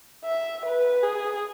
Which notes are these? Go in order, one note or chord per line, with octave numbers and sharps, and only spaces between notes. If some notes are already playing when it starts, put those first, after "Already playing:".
E5
B4
G#4